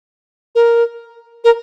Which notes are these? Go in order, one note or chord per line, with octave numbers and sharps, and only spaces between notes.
A#4
A#4